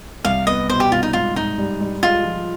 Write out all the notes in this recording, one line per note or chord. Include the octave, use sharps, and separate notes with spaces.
C2 F5
B3 D#5
B2 C5
G4
C2 F4
D#4
G#2 F4
G#2 D#4
G3
G3
G#3 F4
F3